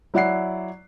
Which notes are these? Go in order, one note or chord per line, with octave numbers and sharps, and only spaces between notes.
F#3 E4 D5 F#5 F#6 C7